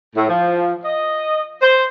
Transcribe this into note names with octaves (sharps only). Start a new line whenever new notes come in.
A2
F3
D#5
C5